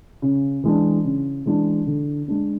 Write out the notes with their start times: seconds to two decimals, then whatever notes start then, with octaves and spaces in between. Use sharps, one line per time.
0.22 C#3
0.64 E3 G#3 D4
1.04 C#3
1.46 E3 G#3 D4
1.87 D3
2.28 G#3 D4